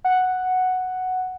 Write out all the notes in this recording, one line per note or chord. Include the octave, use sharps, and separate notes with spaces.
F#5